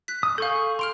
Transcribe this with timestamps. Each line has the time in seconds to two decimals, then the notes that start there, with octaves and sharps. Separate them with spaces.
0.08 F#6 B6
0.23 D#6
0.38 G#4 A4 F5 C#6 G6
0.79 C6 F6 D7 F7